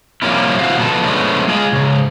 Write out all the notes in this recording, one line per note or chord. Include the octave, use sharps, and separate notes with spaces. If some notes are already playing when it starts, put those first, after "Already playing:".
C3 F3 G3 A#3 C#4 E4
E3 C4 F#4 C5 F5
E2 B2 F3 B3 A4 A5
F3 G#3 A3 B3 C#4 D4
G#3 F4 G#4
G#2 C#3